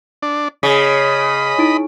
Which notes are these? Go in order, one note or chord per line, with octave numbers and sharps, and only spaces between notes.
D4
C#3 D#5 B5
D#4 E4 D7